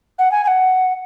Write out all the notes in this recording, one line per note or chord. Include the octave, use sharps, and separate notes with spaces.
F#5
G#5
G#5
F#5